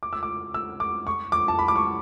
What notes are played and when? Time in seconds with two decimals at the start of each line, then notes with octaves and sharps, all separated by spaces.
0.03 D6
0.13 E6
0.23 D6
0.54 E6
0.80 D6
1.07 C#6
1.32 D6
1.48 A5
1.59 B5
1.68 D6
1.76 C#6